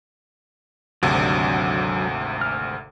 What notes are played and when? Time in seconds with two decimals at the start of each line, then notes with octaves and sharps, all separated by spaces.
1.03 G#1 D2 C3 F#3 D4
2.41 F6